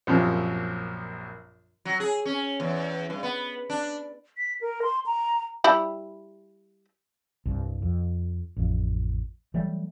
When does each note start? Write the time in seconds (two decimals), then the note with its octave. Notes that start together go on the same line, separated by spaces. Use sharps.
0.07 A#1 F#2 C3 F3
1.85 F#3
2.00 G#4
2.25 C#4
2.60 E2
3.10 G2
3.23 B3
3.70 D4
4.38 B6
4.61 A#4
4.83 C6
5.06 A#5
5.64 G3 E4 B5
7.46 C2 G2
7.82 F2
8.56 A1 F2
9.54 E3 F#3 G3 A3